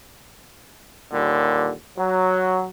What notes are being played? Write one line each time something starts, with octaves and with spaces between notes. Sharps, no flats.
D#2 A#2 D3 G3
F#3